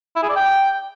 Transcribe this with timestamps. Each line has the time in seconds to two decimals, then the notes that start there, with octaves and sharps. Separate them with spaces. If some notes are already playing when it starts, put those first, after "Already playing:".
0.16 E4
0.23 G#4
0.29 D5
0.36 G5